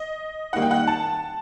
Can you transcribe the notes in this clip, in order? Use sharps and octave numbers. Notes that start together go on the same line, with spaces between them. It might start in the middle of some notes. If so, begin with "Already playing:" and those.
Already playing: D#5
D#3 G3 A#3 D#4 F#5
G5
F#5
A5